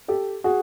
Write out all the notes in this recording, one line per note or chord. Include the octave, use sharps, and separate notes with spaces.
G4 A4
F#4 G#4